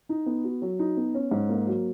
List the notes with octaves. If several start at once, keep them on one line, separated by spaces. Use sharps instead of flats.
D#4
B3
F#4
F#3
D#4
B3
C#4
G#2
A#3
F#3